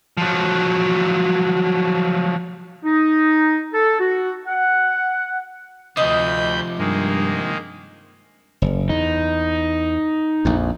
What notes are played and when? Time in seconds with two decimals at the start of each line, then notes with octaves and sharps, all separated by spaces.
0.17 F3 F#3
2.84 D#4
3.73 A4
4.00 F#4
4.47 F#5
5.97 D2 C3 F3 D#5 B5 G6
6.79 G2 D#3 G#3 A#3
8.62 F#1
8.89 E2 D#4
10.45 A#1 F2